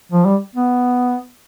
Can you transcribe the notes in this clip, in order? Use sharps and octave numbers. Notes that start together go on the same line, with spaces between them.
F3
G3
B3